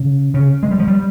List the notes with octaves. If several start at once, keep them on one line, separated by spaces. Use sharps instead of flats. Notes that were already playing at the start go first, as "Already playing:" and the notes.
Already playing: C#3
C#3
G#3
G3
F3
G3